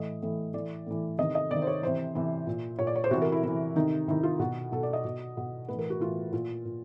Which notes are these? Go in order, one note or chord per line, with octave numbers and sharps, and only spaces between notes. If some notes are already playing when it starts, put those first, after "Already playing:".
Already playing: A2 E3 D#5
A2 E3
A2 E3 D5
A2 E3
C3 D#3 D#5
D#5
C3 D#3 D5
C5
C#5
C3 E3 C5
C3 E3
A#2
A#2 C#5
D5
C#5
C5
C3 E3 F#4
A#4
E4
C3 E3 E4
C3 D#3 D#4
C3 D#3 E4
F4
B2 F#4
B2 A4
D5
D#5
B2
B2
A2 B4
E3
A#4
F#4
A2 E3 F4
A#2 F4
A#2